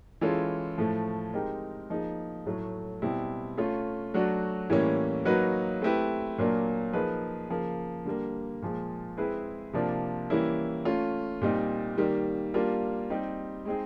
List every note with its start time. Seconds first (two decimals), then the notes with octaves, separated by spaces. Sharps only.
0.21 E3 G#3 C#4 F4 A4
0.78 A2 F3 A3
1.33 G#3 C4 D#4 G4 A#4
1.90 F3 A#3 D#4 G#4
2.46 A2 F#3 A3
3.02 B2 G3 C4 E4
3.58 A3 C#4 F4
4.14 F#3 A3 D4 F#4
4.70 A2 E3 G3 A#3 C#4
5.25 F#3 A#3 D#4 F#4 B4
5.82 A3 C4 E4 G4 B4
6.38 A#2 F#3 A#3 D4
6.93 F3 A#3 D#4 G#4 B4
7.50 C#3 F3 A#3
8.05 D3 G3 A#3
8.62 A#2 F3 G#3
9.17 G#3 C4 E4 G#4 B4
9.73 C3 F3 A#3 D4 F4
10.30 E3 G3 A#3 C#4 E4
10.85 A3 C#4 F4
11.42 A#2 G3 C4 D#4
11.97 D#3 G3 A#3
12.54 G3 A#3 D4 F4
13.10 G3 C4 D#4 G4
13.65 G#3 C4 D#4 G#4